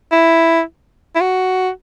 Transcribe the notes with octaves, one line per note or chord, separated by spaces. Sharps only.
E4
E4
F#4